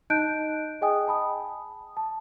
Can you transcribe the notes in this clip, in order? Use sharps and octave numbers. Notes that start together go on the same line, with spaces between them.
D#4 D#5 A5 F#6 G6 D7
G#4 D#5 G5 G#5 D#6
A5 B5 D#6
A5